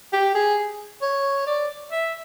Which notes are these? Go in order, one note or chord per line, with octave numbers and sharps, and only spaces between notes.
G4
G#4
C#5
D5
E5